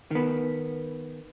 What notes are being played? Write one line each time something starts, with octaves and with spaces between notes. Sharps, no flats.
D#3 B3